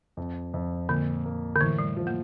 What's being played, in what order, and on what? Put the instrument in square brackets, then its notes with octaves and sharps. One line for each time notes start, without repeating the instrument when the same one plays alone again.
[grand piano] F2
F2
[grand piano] A#2 [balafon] D3
[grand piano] A#3
[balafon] D3
[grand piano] A2 [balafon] E3
[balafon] G3
[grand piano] F3
[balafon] A#3